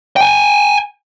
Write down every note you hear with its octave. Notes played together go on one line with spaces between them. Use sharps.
G5 G#5